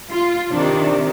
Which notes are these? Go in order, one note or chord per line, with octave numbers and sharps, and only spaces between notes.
F4
C3 D#3 D4